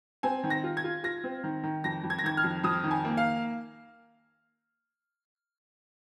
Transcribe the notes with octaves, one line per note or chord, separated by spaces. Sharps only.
C4 G#5
D#3
A#6
F4
G#6
F4
F4 A#6
C4
D#3
D#3
F2 A#6
F2
G#6
A#6
D#3 G#6
F6
F2
F2 D#6
D#3
G#5
A#3
F5